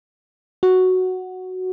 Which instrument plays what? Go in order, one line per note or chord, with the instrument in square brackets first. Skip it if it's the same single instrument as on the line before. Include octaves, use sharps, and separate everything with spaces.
[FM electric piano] F#4